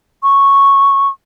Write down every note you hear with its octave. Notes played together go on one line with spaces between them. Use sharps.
C#6